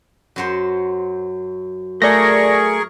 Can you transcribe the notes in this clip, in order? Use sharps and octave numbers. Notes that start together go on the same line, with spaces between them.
F#2 F#3 C5
A3 G#4 A#4 D5 C#6 A#6